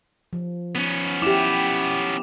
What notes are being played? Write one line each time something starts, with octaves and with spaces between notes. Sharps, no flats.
F3
B3 C#4
E4 G4 D6 E7